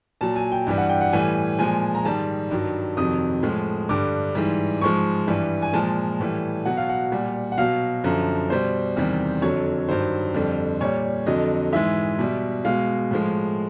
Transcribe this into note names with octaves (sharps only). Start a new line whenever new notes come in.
A#2 F#3 A5
G#5
G5
G2 E3 G3
F#5
G5
F#5
A2 E3 G3 G#5
A#2 F3 G#3 G#5
A#5
G#2 D#3 G3 A5
G2 D#3 F#3
F2 C3 D#3 F#3 D#6
A2 F3 G#3
G2 D3 G3 D6
G#2 E3 G3
G#2 F3 G#3 C#6
G2 E3 G3
G#5
A#2 F3 G#3 A5
A2 E3 G3
B2 F#3 F#5
F5
F#5
A#2 G3
F#5
B2 F#3 F5
F#2 D3 F3
B2 G3 C5
E2 C3 D#3 G3
F2 D3 F#3 C#5
G2 D#3 F#3 C5
F2 D3 G3
A#2 G3 C#5
F2 D3 F#3 D#5
G#2 E3 G#3 E5
B2 G3
B2 G#3 F5
A2 F3 G#3